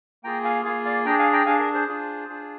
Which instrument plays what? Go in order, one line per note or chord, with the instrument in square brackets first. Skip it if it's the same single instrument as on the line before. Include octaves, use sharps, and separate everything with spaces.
[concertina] A#3 F4 G#4 G5 A#5
F5 G#5
A#3 F4 G#4 F5 G#5
D5 F5
D4 G#4 G5 A#5
F5 G#5
G5 A#5
D4 G#4 F5 G#5
A#4
G#4 C5
D4 F4 G#4
D4 F4 G#4